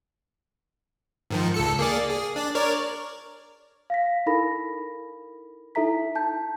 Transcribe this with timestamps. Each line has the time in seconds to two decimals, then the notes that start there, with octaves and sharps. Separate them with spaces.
1.30 G#2 D#3 F3
1.54 C#2 A4 C#7
1.79 A#3 G#4 D5
2.09 G#4
2.36 D4 D5
2.55 A#4 C#5 D5
3.90 F5 A#6 B6
4.26 D#4 E4 A4 A#4 B5 A#6
5.75 D#4 E4 A4 E5 A#5 B6
6.15 D#4 A5 G6